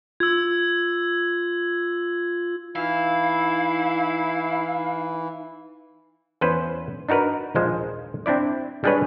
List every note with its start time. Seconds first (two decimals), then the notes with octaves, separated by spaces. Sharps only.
0.20 F4 E6 G#6
2.76 E3 D#4 E4 F5
6.41 E2 C#4 B4 C5
7.09 D4 D#4 F#4 A#4 B4
7.55 A#1 D#2 F3 G#3 C5
8.26 C4 D4 E4 D5
8.84 G3 G#3 D4 G#4 B4 C#5